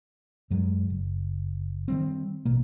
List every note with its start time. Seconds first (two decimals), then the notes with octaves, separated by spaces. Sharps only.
0.50 F#2 F#3 G#3
0.90 F#1
1.88 D#3 G3 C4
2.45 A1 B2 A#3